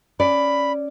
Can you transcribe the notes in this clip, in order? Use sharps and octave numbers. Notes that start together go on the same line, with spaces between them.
C#4 D5 B5